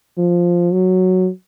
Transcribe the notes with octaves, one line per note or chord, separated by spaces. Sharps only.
F3
F#3